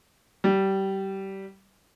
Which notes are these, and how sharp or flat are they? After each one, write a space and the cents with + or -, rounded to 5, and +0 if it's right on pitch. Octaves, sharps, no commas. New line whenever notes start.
G3 -20